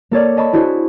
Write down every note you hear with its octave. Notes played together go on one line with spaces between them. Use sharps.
A#3 A4 C#5 D5
D#5 A5 B5 C#6
D4 E4 F#4 G#4 C5